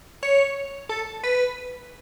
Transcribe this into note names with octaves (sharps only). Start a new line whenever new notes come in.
C#5
A4
B4